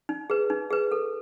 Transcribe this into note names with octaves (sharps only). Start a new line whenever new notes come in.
D#4
G#4 B4
D#4
G#4 B4
A4